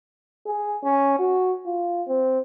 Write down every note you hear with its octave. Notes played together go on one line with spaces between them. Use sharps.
G#4
C#4
F#4
F4
C4